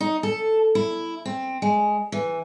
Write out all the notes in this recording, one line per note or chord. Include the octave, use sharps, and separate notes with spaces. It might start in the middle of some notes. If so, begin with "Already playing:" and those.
D#4
A4
E4
C4
G#3
E3